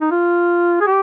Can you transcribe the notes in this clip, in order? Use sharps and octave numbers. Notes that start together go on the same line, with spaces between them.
D#4
F4
G#4
G4